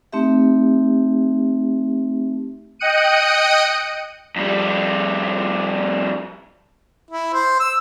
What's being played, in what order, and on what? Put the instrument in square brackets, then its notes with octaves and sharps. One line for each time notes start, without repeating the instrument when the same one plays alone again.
[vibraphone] A3 C4 D#4 G4 E5
[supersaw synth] D#5 G5 D#6 F#6 C#7 D#7
[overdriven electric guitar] F2 G3
[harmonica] E4
C5
E6